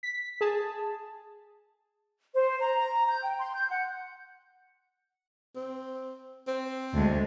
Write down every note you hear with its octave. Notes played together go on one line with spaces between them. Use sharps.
B6
G#4 A5
C5
A#5
A#5
G6
G5
C6
G6
F#5
C4
C4
D2 G#3